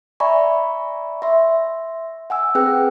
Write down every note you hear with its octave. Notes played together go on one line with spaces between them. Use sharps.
D5 E5 G#5 A#5 B5 C#6
E5 C6
F#5 G#5 E6
C4 G#4 B4 G5 F#6